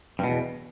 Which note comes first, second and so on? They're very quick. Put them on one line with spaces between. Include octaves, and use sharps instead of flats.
G2 B2 E2